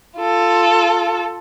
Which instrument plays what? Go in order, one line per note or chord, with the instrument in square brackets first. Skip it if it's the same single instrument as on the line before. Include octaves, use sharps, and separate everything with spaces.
[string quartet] F4 A4